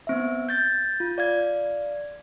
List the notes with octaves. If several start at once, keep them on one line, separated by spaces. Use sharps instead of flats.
B3 C4 E5
G6 A6
F4
D5 F5 G#6